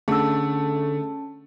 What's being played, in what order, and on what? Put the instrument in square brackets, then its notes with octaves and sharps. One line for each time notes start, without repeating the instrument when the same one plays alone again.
[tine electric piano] D3 [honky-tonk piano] A3 [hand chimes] C#4 A5 [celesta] G#4 E6